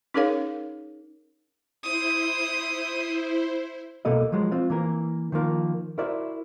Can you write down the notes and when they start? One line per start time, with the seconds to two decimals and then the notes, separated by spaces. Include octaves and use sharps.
0.14 C#4 D#4 G#4 A#4 C#5 F5
1.83 E4 C5 D#6
4.05 C2 B2 A#3 A4 A#4 D#5
4.32 F3 F#3 G#3
4.52 C4 F4
4.70 E3 A#3 A#4
5.32 D#3 F3 A#3
5.98 E4 F#4 A#4 C5 D5 E5